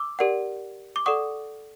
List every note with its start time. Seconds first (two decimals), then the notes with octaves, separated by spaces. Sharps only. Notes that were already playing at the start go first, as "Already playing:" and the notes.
Already playing: D6 E6
0.19 G4 A#4 D5 F#5
0.96 D6
1.06 A4 D5 F#5 C#6 D#6